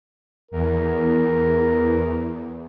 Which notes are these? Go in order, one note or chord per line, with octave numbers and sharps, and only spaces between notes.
E2 A#4